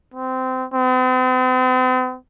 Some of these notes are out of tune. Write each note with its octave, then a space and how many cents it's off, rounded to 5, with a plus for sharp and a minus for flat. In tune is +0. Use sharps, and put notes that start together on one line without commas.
C4 -20
C4 -45